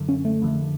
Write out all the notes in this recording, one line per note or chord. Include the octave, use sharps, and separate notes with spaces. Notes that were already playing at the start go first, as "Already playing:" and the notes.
Already playing: F#2 D3
C#4
A3
F2 D3